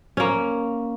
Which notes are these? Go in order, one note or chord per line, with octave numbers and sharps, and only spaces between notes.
A#3 C#4